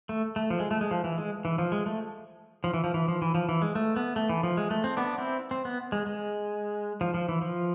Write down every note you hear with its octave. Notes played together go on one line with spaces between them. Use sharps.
A3
A3
F3
G#3
A3
G#3
F3
E3
G#3
E3
F3
G#3
A3
F3
E3
F3
E3
F3
E3
F3
E3
G#3
A3
B3
A3
E3
F3
G#3
A3
C4
B3 D4
C4 E4
C4
B3
G#3
G#3
F3
F3
E3
F3